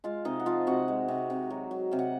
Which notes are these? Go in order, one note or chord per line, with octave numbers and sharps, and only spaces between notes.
G#3 F4 F5
C3 D#4 D#5
F#5
F3 F4 F5
C3 F#4 F#5
G#3
C3
C3
F#3
F#3
C3 F5
F#5